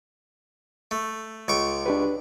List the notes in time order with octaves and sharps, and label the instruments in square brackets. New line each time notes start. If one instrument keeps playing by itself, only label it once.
[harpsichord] A3
C#2 C#6 D6
[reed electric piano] D4 G4 B4